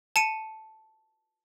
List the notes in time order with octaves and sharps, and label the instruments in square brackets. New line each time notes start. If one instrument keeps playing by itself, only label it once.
[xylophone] A5 C#7 D#7